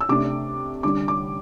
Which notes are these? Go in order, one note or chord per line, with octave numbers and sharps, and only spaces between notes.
E6
C3 A3 D4 D6
D3 G3 D4 D6
D6